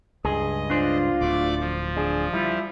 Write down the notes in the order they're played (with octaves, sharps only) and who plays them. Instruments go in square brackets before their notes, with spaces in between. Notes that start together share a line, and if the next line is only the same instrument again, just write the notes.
[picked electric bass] C#2 G2 [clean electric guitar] G#4 [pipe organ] D#5
[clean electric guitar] D4 C5 [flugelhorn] F4
[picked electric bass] D1 D2 [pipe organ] A3 D5 D6
[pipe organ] F3
[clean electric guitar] D4 [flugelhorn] G#4
[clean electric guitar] G3 F4 [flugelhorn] E4